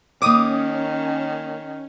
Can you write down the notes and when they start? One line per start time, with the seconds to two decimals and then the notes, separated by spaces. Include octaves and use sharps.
0.22 D#3 A#3 C#4 C#5 D6 D#6